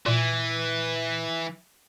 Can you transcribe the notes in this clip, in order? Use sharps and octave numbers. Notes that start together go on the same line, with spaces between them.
A#2 E3